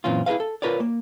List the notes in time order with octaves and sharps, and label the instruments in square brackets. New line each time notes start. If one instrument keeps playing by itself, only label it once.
[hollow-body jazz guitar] F#2 A#2 E3 C4 C#4 F4
E4 G#4 A4 B4 F5
A4
F4 A#4 B4 C#5 D5
A#3